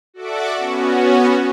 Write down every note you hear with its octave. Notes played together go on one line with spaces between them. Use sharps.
F#4 A4 D5 E5 F#5 D6
B3 C#4 F#4